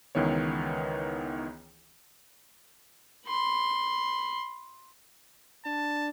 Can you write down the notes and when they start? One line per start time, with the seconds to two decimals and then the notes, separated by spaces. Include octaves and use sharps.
0.15 C#2 D#3 E3 B3 C#5
3.26 B5 C6
5.65 D4 A5